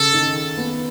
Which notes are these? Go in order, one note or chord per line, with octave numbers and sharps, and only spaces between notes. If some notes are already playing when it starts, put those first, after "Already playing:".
Already playing: C#3 A4
D#3
B3